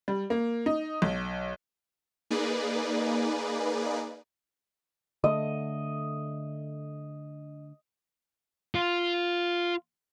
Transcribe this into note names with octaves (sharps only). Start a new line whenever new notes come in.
G3
A#3
D#4
B1
A#3 D#4 G#4 B4 D5
D3 A3 D#5
F4